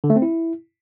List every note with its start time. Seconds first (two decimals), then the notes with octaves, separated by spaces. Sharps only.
0.04 D3
0.10 A3
0.16 C4
0.22 E4